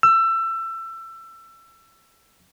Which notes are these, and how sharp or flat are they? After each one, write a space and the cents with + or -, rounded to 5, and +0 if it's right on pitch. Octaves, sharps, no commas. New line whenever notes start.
E6 +25